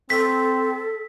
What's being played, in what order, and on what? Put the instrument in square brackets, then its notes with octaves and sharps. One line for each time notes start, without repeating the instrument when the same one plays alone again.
[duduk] C4 [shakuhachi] A4 [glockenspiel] B6